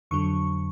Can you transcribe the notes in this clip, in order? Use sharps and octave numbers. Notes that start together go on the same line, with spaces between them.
F2 D3 F#3 C#6